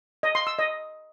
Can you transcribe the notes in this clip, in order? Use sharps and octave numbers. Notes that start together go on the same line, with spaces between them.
D#5
C6
E6
D#5